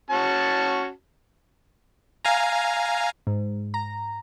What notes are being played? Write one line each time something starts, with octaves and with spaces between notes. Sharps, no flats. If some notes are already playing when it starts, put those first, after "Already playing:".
C#4 F#4 A5
F5 G#5 A#5
G#2
A#5